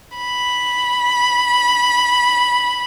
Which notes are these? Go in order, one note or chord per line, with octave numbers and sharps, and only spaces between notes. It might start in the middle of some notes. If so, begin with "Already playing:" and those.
B5